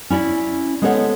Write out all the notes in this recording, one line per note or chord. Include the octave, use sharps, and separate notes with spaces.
C#4 E4 D5 E5
G#3 B3 A4 C5 C#5 F#5